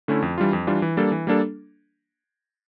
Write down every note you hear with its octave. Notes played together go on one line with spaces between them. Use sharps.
D3 A3 C#4 E4
F2
E3 G3 D4 F4
F2
E3 G3 D4 F4
E3
G3 A#3 D4 A4
E3
G3 A#3 D4 A4